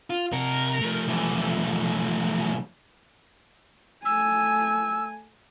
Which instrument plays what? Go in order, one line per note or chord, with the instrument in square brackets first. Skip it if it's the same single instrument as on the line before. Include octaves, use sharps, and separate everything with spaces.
[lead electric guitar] F4
[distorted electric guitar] C3 F#5 [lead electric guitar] A#4
[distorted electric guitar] F3 A3
[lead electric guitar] B1 E3
[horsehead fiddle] A3 G#5 [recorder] E6